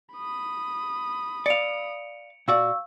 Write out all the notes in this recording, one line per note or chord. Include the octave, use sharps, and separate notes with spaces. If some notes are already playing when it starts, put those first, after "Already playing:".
B5 D#6
D5 F5 C#7 D7 F7
A#2 F#4 D5 F5 C#6 E6